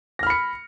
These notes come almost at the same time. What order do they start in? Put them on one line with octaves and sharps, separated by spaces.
A#6 F6 B5 C#7